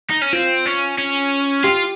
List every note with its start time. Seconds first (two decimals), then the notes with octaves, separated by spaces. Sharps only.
0.10 D#4
0.22 C#4
0.33 C4 F4
0.66 C#4
0.98 C#4
1.64 F4 G4